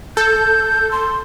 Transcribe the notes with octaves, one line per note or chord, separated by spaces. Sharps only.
A4 G6
C6